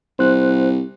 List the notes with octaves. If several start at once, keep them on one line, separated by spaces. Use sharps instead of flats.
C2 C5 F#6